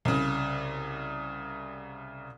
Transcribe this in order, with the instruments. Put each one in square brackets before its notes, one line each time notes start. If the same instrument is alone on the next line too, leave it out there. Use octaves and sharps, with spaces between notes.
[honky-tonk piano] C2 C#3